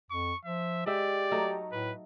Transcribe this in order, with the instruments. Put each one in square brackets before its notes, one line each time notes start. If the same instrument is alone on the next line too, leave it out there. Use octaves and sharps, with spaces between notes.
[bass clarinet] F2 [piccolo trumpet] C#6
[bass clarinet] F3 [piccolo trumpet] E5
[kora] G#3 E5 G5 [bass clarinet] G4 [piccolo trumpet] D5
[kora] F#3 A3 D#4
[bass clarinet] A2 [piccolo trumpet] B4